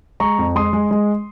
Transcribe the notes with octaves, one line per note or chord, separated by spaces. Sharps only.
G#3 A#5 C#6
F2
G#3 C6 D#6
G#3
G#3